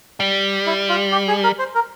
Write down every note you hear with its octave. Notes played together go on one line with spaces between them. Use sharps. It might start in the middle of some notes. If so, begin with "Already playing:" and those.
G3
E4
F4
G4
G#4
A#4
C5
A#4